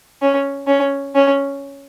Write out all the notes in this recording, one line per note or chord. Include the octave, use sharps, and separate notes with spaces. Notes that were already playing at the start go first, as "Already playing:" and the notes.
C#4
C#4
C#4